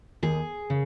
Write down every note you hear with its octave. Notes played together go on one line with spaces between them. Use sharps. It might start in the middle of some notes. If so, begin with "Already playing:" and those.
D#2 G#4
C#3